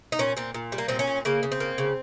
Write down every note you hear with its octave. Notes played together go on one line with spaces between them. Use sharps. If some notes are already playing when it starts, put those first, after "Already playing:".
D#4
A#2 C#4
A#2 C4
A#2
G3
A#3
A#2 C4
C#4
A#2
C#3 A#3
C#3
C4
A#3
C#3